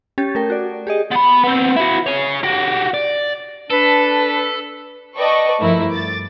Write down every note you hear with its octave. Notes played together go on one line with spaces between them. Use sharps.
C#4 G4 G#6 A6
A3 A#4 G5
F#4 D5
G4 G#4 D#5
B3 B5
B3 C4
E4 F#4
G#4 C#5
F#4 G4
D5
D4 A4 B4
B4 D5 D#5 G5 A5 C#6
G2 F3 A3 E4 A#4
D6 A6